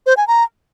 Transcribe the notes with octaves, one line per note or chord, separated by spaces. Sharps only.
C5
G#5
A#5